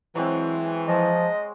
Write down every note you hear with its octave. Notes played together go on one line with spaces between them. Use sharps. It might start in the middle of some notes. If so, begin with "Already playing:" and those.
E3 F#3 G#3 C4
F3 D#5